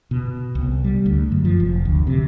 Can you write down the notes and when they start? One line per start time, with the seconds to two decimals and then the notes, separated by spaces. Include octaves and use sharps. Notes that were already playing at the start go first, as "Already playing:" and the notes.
0.11 B2
0.55 C2
0.84 G3
1.06 D2
1.32 F#2
1.45 F3
1.60 F1
1.85 D2
2.07 C3